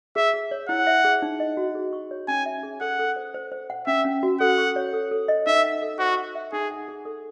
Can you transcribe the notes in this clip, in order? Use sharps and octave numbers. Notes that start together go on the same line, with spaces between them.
G#4 E5
G#4
C#5
E4 F#5
E5
G#4
D#4
D#5
F#4
G#4
C#6
C#5
C#4 G#5
E5
G#4
A4 F#5
A4
C5
C5
C5
F#5
C#4 E5
C#4
F#4
A4 F#5
C#6
C#5
A4
A4
D#5
D#4 E5
F#5
A4
F#4 C5
C#6
E5
D#4 G#4
F#5
G#4
A4